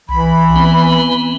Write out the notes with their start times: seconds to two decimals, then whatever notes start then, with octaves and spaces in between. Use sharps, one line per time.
0.09 C2 E3 B5
0.56 B3 C4